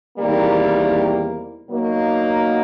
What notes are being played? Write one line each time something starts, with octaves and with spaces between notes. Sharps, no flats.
E2 C3 D#3 G3 A#3
B2 F#3 A#3 D#4